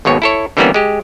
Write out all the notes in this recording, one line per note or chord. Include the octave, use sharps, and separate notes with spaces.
G#1 D#2 B2 C#5
E4 A4 C#5
D3 E3 G3 A#3 B3 C#4
G#3 G4